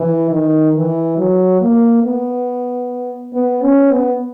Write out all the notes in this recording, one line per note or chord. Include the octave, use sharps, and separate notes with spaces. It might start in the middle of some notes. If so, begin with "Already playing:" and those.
Already playing: E3
D#3
E3
F#3
A#3
B3
B3
C#4
B3